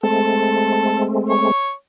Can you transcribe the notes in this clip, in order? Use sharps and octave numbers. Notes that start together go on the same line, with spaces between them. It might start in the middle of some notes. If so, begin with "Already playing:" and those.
G#3 A3 C4 A4
C#5